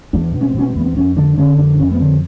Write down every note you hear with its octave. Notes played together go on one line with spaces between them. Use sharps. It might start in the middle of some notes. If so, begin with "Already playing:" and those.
E2 D4
B2
C#4
C4
B2 C#4
C4
E2 B3
C4
F2 C#4
D3 D4
D3 C#4
F2 D4
F2 C#4
B3
D3 C4